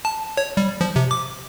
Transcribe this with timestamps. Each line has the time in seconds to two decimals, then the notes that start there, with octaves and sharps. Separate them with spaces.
0.05 A5
0.37 C#5
0.57 G3
0.81 F3
0.96 C3
1.11 D6